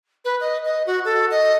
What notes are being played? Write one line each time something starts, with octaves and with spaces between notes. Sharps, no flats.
B4
D#5
D#5
F#4
A4
D#5